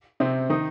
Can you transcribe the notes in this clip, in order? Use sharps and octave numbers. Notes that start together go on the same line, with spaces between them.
C3 C4
D#3 D#4